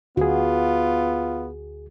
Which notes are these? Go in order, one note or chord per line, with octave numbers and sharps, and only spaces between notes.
D2 B3 F4 F#4 G#4